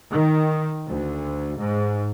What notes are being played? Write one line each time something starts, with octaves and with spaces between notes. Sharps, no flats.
D#3
D2
G#2